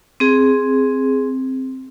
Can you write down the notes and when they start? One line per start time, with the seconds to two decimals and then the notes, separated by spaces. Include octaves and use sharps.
0.20 C4 G#4